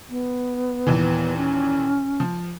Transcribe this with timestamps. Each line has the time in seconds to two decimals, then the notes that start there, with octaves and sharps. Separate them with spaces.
0.10 B3
0.87 D#2 A#2 E3
1.37 C#4
2.20 F3